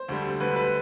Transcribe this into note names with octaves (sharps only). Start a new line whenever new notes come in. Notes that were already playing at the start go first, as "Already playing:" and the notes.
Already playing: C5
D2 D3 G3
D2 D3 G3 B4
B4